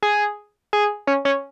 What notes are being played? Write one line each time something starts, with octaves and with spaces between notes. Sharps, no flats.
G#4
G#4
C#4
C#4